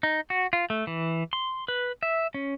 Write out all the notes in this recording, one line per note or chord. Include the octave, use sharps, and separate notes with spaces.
D#4
F#4
F4
A3
E3
C6
B4
E5
C#4